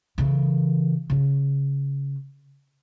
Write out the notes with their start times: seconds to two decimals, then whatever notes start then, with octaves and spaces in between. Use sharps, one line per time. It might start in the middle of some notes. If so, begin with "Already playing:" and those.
0.18 C#3 E3
1.10 C#3 C#4